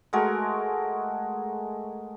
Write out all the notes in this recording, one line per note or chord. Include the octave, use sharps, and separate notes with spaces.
G#3 A3 F#4 A#4